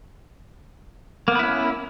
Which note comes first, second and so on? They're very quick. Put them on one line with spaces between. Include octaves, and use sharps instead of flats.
A#3 B3 B4 E4 C#4